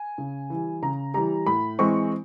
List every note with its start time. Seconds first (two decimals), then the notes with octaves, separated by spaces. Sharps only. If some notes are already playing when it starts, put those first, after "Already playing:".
Already playing: G#5
0.18 C#3
0.50 E3 G3
0.82 C#3 A#5
1.14 E3 G3 A#5
1.46 A2 B5
1.79 E3 G#3 C4 C#6